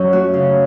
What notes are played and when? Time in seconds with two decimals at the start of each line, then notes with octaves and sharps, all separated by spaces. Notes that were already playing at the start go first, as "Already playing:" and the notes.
Already playing: F#2 F#3 C#4
0.13 A3 F#4
0.34 C#3